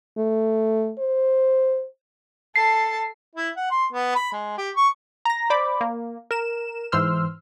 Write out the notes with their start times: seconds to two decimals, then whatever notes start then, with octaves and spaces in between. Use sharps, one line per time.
0.18 A3
0.99 C5
2.56 A4 A5 C7
3.36 E4
3.57 F#5
3.71 C6
3.93 B3
4.15 B5
4.32 G#3
4.58 G4
4.76 C#6
5.25 A#5 A#6
5.50 C5 D5 B5 D6
5.81 A#3
6.31 A#4 E7
6.92 G#2 E3 C5 C6 E6 F6